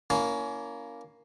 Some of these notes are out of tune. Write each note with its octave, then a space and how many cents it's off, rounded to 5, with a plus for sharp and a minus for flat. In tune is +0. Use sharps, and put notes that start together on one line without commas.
A#3 +0 C#4 +25 E4 +0